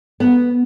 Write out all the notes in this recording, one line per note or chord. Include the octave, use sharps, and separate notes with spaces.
B3